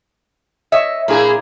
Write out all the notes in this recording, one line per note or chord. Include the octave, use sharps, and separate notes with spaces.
C#5 D#5 E5
A#2 A#3 E4 G#4